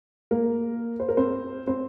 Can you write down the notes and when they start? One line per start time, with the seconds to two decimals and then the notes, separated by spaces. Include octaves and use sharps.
0.31 A#3 A#4
1.00 C5
1.08 A#4
1.17 C4 C5
1.67 C4 C5